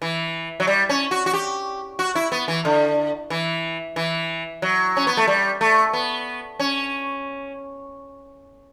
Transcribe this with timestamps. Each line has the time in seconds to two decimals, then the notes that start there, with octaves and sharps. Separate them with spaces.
0.02 E3
0.60 F#3
0.67 G3
0.89 C#4
1.11 F#4
1.26 F#4
1.33 G4
1.99 F#4
2.15 E4
2.32 B3
2.48 E3
2.65 D3
3.30 E3
3.96 E3
4.62 F#3
4.97 C#4
5.07 B3
5.17 A3
5.28 G3
5.61 A3
5.93 B3
6.59 C#4